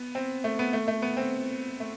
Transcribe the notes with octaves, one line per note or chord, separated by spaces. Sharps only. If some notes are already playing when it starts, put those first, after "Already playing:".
Already playing: B3
C4
A3
B3
A3
A3
B3
C4
A3